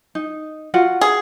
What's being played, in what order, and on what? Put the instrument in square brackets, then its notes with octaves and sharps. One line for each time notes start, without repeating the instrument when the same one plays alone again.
[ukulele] D#4
F4 F#4 F#5
[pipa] G#4